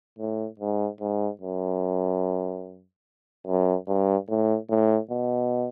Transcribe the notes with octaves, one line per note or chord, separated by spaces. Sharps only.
A2
G#2
G#2
F#2
F#2
G2
A2
A2
B2